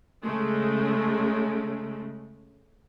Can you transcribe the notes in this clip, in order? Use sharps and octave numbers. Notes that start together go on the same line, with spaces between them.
C#3 G#3 A3